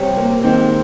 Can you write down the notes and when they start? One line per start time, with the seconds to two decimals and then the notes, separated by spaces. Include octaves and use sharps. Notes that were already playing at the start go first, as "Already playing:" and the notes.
Already playing: C3 G3 C4 G4 C#5
0.17 A#3
0.43 G#2 D#3 G#3 C4 D#4